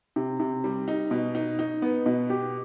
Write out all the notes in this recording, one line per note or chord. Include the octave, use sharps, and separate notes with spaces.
C3
C3
G3
D#4
B2
D#4
D#4
B3
B2
G4